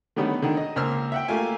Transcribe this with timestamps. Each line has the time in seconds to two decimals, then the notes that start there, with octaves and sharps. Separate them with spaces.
0.16 D3 D#3 G3 A3 B3 C#4
0.42 D3 D#3
0.57 D#5
0.76 C#2 A#3 C5 E6 F6
1.12 E5 F#5 G5
1.28 A3 A#3 F4 G4 G#5